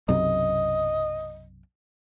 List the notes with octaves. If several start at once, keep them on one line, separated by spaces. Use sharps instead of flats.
B1 F#2 C3 D#5